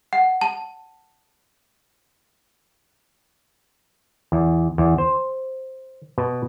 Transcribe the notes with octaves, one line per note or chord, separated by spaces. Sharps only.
F#5
A5
E2
E2
C5
B2